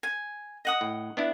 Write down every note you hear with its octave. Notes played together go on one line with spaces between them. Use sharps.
G#5
D#5 F#5 D#6
A2
B3 D4 E4